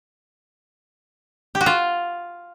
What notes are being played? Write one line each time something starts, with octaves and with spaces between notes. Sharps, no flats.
G4
F#4
F4